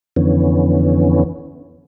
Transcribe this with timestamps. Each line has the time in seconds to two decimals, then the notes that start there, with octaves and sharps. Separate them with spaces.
0.16 F2 D3 E3 B3 C#4